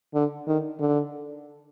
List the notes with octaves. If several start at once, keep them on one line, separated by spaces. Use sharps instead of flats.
D3
D#3
D3